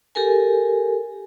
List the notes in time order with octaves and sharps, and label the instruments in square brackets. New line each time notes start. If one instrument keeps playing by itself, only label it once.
[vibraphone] G4 A4 A#4 G#5